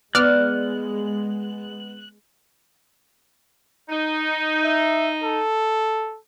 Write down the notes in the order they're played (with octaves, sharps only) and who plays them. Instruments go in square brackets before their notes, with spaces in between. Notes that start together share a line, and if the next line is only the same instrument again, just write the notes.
[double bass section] G#3 [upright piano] B3 [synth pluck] D5 F6 [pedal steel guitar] F#6
[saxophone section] D#4
[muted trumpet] E5
A4